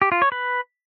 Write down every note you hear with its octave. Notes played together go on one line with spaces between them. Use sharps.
G4
F4
C#5
B4